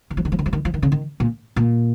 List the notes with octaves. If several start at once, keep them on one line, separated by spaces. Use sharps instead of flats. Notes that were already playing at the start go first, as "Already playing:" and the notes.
D#3
F3
D#3
F3
D#3
F3
D#3
F3
D#3
C#3
D#3
A#2
A#2